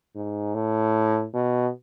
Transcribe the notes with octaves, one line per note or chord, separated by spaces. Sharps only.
G#2
A2
B2